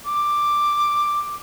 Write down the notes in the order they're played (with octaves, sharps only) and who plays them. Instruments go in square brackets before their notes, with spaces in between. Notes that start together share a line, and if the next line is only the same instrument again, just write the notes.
[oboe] D6